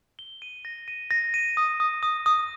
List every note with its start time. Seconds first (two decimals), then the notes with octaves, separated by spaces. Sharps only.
0.19 G7
0.42 D#7
0.65 A#6
0.88 D#7
1.11 A#6
1.34 D#7
1.57 D#6
1.80 D#6
2.03 D#6
2.26 D#6